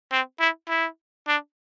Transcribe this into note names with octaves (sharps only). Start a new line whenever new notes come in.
C4
E4
E4
D4